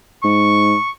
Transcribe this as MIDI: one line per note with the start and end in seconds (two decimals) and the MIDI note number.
0.24 0.75 44
0.24 0.91 85